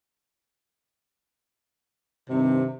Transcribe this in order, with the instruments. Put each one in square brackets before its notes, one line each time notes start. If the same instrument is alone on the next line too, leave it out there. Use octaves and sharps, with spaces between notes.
[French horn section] G2 D#3 C4 [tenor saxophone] C3